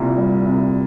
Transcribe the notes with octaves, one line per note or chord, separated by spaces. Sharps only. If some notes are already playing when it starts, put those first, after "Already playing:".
Already playing: C2 A#2
G3
C2